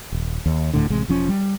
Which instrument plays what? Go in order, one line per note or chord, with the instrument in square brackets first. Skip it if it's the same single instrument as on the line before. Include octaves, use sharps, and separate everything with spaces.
[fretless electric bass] D#1
D#2
D#1 D2 A2 D3
A1 C3 G#3
E1 F3 C#4
G3